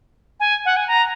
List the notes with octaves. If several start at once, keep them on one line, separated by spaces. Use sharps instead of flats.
G#5
F#5
G#5
A#5